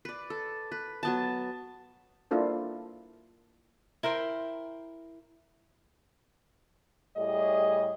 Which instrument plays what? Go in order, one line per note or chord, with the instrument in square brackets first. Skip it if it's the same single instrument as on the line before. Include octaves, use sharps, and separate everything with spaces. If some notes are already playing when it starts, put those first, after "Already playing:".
[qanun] B4 D5
A4
B4
F#3 B3 A5
[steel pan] A#3 D4 E4 F4 A4 C5
[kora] E4 A#4 C5 G5
[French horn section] A2 G3 G#4 C#5 D#5